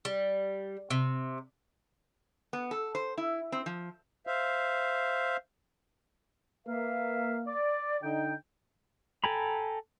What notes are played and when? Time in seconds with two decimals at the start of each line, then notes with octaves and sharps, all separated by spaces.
0.05 G3
0.90 C3
2.53 B3
2.71 A4
2.95 C5
3.18 E4
3.52 C4
3.66 F3
4.27 C5 E5 F5
6.66 A#3 B4 E5 F5
7.46 D5
8.02 D3 D#4 G5
9.24 A4 G5 G#5 A#5 B5